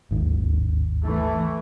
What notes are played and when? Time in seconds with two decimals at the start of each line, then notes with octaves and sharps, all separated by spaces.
0.11 D1 G#1 D#2
1.03 E3 A3